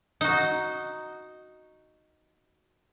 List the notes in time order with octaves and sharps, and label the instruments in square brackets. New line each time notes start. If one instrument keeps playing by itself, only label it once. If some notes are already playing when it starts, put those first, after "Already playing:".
[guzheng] D#4 F#4